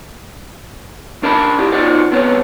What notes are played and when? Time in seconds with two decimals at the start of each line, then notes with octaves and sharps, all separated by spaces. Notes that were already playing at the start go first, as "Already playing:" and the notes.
1.23 D4 A#4 D5 A5 B5
1.59 E4 G4
1.72 D#4 F4 F#4 C5 D5
2.11 C2 B3 C4 C#5